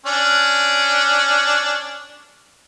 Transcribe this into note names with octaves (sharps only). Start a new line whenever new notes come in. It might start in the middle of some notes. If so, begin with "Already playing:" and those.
C#4 D4